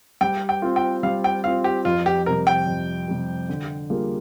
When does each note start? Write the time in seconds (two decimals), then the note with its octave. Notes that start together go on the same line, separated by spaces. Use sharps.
0.21 G3 G5
0.49 G5
0.62 C4 F4
0.76 G5
1.03 G3 F5
1.24 G5
1.44 C4 F4 F5
1.64 G4
1.85 F2 F4
2.06 G4
2.26 C3 G3 A#4
2.47 G5
2.67 F2
3.08 C3 G3
3.49 D3
3.90 G3 A#3 F4 G#4